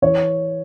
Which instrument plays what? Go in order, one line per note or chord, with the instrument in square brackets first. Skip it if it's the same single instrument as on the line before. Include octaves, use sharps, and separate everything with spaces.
[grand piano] E3 C#5